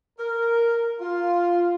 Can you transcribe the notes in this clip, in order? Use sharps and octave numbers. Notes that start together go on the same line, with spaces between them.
A#4
F4